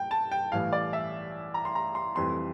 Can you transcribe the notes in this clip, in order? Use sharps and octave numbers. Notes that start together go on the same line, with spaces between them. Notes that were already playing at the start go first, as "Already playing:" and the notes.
Already playing: G5
A5
G5
A1 A2 E3 G3 F5
D5
E5
A#5
C6
A#5
C6
F1 F2 E3 G3 C4 C6